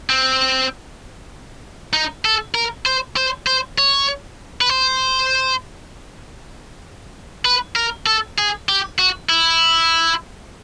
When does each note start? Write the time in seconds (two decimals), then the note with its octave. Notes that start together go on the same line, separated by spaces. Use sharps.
0.10 C4
1.93 D#4
2.25 A4
2.54 A#4
2.86 C5
3.16 C5
3.47 C5
3.78 C#5
4.61 B4
4.70 C5
7.45 B4
7.76 A#4
8.06 A4
8.38 G#4
8.69 G4
8.99 F#4
9.29 E4